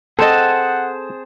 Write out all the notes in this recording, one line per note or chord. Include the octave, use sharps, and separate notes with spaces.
C4 G#4 A4 C5 D#5 F#5 A5